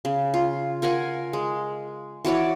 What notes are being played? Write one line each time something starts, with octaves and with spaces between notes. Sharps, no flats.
C#3
F4
F4 A#4 F#5 G#5
G#3
E3 F#4 C#5 D5